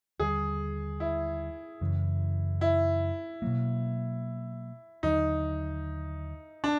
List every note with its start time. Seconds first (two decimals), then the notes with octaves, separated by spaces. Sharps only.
0.19 D#2 D3 G3 G#4
1.00 E4
1.81 F#2 C#3 E3
2.61 E4
3.42 B2 F#3 A#3
5.03 D#2 D3 F#3 D#4
6.64 D4